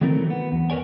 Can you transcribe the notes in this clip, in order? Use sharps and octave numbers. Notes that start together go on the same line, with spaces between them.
D#3 E3 F#3 A3 C4 A#4
B3
E2
A#4 B4 C#5 D5 G#5